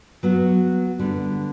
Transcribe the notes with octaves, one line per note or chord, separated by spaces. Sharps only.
F#3 B3 F#4
D3 G3 B3